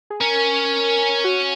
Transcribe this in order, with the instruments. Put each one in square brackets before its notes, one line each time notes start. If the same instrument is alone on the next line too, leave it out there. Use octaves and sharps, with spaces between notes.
[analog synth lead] G#4
[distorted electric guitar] C#4 [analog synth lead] A#4
[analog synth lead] F#4